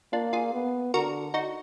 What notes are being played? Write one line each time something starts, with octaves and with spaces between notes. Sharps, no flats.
A#3 D4 F4
F4 G#4
B3
D3 F#4 A#4
D#4 F#4